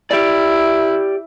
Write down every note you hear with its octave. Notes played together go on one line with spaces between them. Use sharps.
E4 G4 D5